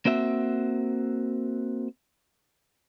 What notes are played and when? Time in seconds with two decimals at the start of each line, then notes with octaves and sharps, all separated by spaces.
0.05 A#3 C4 F#4 E5